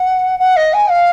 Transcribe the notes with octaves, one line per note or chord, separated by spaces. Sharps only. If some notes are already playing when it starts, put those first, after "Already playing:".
Already playing: F#5
F#5
D#5
G#5
F5